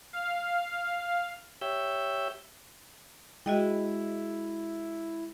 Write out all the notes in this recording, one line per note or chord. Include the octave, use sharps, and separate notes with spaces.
F5
G4 C#5 E5 E6 G6
G#3 E4 F#4 D#5 G5